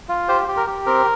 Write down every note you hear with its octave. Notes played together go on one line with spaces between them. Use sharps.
F4
G4 C5
G4
A#4
G4
C4 A#4